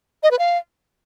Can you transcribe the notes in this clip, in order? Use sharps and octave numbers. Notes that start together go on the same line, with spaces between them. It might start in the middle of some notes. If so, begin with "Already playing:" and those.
D#5
B4
F5